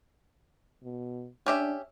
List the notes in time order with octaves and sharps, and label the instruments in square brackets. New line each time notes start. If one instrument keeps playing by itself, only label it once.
[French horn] B2
[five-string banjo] C#4 G4 E5 [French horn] D4